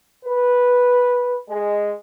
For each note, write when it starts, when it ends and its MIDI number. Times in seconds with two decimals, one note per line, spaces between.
0.25 1.34 71
1.49 1.91 56